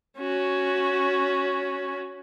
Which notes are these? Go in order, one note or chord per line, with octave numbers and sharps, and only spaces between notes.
C#4 F#4